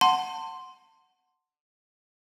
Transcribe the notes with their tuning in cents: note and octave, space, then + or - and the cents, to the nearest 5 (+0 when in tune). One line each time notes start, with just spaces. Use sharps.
F#5 +0 A5 +30 C6 +0